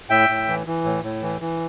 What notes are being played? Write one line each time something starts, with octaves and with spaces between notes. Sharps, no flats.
A2 E5 G5
A2
E3
E3
A2
A2
E3
E3